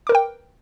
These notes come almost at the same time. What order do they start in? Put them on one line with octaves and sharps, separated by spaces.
D6 A#4 B4 G5